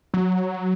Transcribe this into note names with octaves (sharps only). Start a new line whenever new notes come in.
F#3